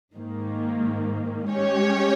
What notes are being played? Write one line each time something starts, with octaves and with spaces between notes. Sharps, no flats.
G#2 D#3 A#3
G#3 C#4 G4 C#5